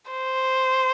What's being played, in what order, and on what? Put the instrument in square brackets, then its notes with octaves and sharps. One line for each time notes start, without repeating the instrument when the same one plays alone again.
[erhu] C5